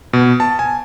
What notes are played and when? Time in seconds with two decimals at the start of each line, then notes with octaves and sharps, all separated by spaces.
0.13 B2
0.40 A5
0.59 G#5